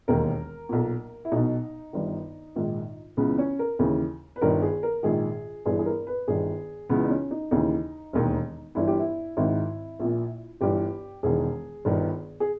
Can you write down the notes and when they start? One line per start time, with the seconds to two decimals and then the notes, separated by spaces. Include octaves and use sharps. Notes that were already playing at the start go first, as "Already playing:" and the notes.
0.08 E1 D#2 D#3 A#4
0.69 B1 A#2
1.25 E4
1.32 B1 B2 D#4
1.93 G1 G2 D#3
2.56 A#1 G#2 D#3
3.17 C#2 C#3 E3 B3
3.38 C#4
3.59 A#4
3.79 D#2 C#3 E3
4.36 B4
4.41 G1 G2 D#3 A#4
4.62 G#4
4.83 A#4
5.03 A#1 G#2 D#3 G#4
5.66 G1 G2 E3 G#4
5.79 G#4
5.86 A#4
6.07 B4
6.28 G1 G2 D#3 G#4
6.89 C#2 C#3 E3 B3
7.05 D#4
7.10 C#4
7.31 D#4
7.51 D#2 C#3 E3 D#4
8.13 E1 D#2 D#3
8.75 G1 G2 E3 E4
8.87 G4
8.99 E4
9.37 G#1 G#2 D#3 E4
10.00 A#1 A#2
10.61 G1 G2 E3 G4
11.23 E1 E2 D#3 G#4
11.85 G1 G2 D#3
12.40 G#4